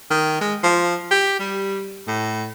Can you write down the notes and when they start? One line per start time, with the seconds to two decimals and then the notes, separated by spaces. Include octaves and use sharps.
0.10 D#3
0.41 G#3
0.63 F3
1.11 G4
1.40 G3
2.07 A2